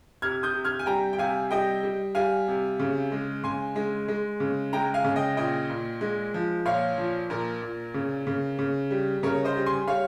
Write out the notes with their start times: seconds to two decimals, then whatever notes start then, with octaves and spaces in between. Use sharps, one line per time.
0.22 C3 F6 G#6
0.43 D#6 G6
0.54 C3
0.65 F6 G#6
0.79 G#5
0.86 G3 G5 A#5
1.13 G5
1.18 C3 F5 G#5
1.51 G3 D#5 G5
1.83 G3
2.15 G3 F5 G#5
2.48 C3
2.79 C#3
3.12 G#3
3.44 C#3 G#5 C6
3.76 G#3
4.08 G#3
4.40 C#3
4.73 G#3 G5 A#5
4.94 F5 G#5
5.04 C#3
5.16 D#5 G5
5.37 A#2 D#5 G5
5.70 A#2
6.01 G#3
6.34 F3
6.65 A#2 C#5 F5
6.98 F3
7.30 A#2 A#4
7.62 A#2
7.94 C#3
8.27 C#3
8.59 C#3
8.91 G3
9.23 C#3 A#4 C#5
9.44 C5 D#5
9.56 G3
9.66 G#5 C6
9.87 G3 C#5 F5